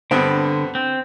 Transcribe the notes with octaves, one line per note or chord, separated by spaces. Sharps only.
G2 D3 B3 C4
C4